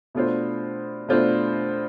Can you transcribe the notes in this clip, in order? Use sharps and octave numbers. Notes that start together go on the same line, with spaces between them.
B2 A3 D4 F4 C5
B2 A3 D4 F4 C5